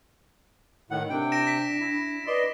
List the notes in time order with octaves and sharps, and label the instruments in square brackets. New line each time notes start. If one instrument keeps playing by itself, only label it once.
[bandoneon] A2 D#3 F#5
[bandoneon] C3 G5 [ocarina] D4
[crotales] A#6 D7 E7
B6
[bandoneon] E4
[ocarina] B4 [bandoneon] D5 D#5 C6